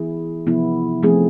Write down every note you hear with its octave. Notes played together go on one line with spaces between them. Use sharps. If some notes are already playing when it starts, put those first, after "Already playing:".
Already playing: E3 B3 E4 G#4
C3 F3 B3 E4
F3 A3 C4 G#4